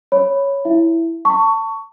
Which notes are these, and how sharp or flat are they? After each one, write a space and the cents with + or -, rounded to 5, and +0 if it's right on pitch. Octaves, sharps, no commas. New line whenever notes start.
C#5 +0 B5 +0
E4 +0 E5 +20
A5 +25 C#6 +15